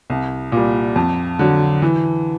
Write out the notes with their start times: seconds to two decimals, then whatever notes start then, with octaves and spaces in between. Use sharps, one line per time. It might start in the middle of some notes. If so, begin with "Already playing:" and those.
0.10 C2
0.52 A#2
0.57 G3
0.96 F2
1.39 D3 F#3
1.82 E3